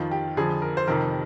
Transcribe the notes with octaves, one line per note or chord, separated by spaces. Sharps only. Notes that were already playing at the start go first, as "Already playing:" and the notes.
Already playing: F2 D#3 F4
G4
F2 D3 F3 G#4
A#4
C5
F2 C3 D#3 A#4